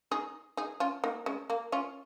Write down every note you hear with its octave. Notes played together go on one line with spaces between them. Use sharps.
D#4 G#4
D#4 G#4
C#4 F4
A#3 D#4
G#3 C#4
A#3
C#4 F4